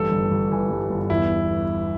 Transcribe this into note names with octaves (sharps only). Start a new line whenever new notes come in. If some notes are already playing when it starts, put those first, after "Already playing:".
Already playing: A1 G2 A4
G1
G1
E3
G2
G1
E2 E4